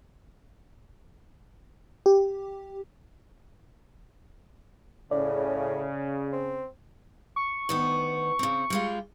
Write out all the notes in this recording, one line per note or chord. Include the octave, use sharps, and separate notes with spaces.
G4
A2 C#3 D5
C4
C#6
D2 D#3 B3
C#3 C4
G3 G#3 F4